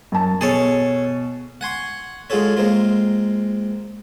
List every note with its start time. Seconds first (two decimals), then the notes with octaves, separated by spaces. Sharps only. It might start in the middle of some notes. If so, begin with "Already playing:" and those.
0.12 F#2 A5
0.41 B2 G#4 A4 C#5
1.61 F#5 G#5 C6 C#6
2.30 G#3 F4 F#4 G#4 A4 C#5
2.57 G#3 A#3 C4 F4